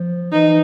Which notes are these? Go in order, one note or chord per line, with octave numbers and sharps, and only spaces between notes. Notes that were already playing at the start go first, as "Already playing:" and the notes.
Already playing: F3
E3 D#4